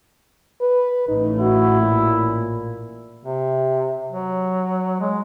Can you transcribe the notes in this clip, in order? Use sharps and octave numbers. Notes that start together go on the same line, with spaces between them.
B4
A1 A2 A3 D#4
E4 F#4
A#2
C3
F#3
G#3